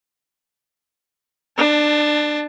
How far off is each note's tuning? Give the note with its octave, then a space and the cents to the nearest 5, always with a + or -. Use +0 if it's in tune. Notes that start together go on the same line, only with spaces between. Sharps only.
D4 +25 A5 +0